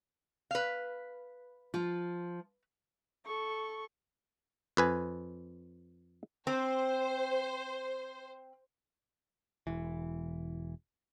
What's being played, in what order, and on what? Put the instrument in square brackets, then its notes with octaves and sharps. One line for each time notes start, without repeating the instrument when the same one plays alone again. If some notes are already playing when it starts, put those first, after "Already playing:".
[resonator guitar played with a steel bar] B4 F5
[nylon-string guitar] F3 F4
[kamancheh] A4 C#6
[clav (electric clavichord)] F2 B4 G#5
[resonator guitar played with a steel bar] C4 [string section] C5
[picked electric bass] E1 E3